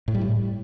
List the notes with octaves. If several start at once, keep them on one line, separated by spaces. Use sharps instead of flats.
A2
G3
A2